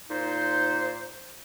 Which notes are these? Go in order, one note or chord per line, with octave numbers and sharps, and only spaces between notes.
A#2 D#4 C5